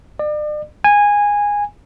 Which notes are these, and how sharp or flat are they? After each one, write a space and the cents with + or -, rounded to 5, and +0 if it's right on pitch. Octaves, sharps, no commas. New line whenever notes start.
D5 +40
G#5 -15